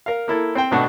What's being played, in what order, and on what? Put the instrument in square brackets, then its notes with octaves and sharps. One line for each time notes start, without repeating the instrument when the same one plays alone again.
[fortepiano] A#4 F5
A#3 E4 A4
C4 C5 G5
G#1 B2 A3 D4 F#4 F#5